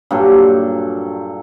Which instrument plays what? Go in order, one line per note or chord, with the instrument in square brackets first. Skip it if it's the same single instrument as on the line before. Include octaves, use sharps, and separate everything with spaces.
[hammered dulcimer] G2 A#2 F#3 A4